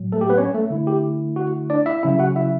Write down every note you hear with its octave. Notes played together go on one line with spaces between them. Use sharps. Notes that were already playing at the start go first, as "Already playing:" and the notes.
Already playing: A2 F#3
A3 A4
G4
B3 B4
C#4 C#5
A3 A4
D3 A3 E4
G4
F#4
D4 D5
E4 E5
C#3 F#3 C#4 E4 E5
F#4 F#5
E4 E5